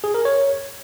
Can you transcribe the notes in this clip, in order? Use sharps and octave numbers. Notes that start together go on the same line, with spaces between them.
G#4
A#4
C#5